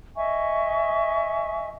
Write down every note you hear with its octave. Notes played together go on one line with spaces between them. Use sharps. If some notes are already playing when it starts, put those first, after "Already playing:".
D#5 E5 G#5 C#6